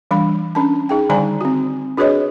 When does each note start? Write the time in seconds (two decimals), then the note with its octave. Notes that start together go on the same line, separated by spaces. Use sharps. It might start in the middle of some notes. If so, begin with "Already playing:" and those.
0.11 E3 G3 D4 B5
0.55 C#4 D4 A5
0.89 D#4 G#4 G5
1.09 D3 D#3 G3 D5 G#5 A#5
1.41 C4 F#4
1.97 D4 F#4 G#4 B4 C#5 D#5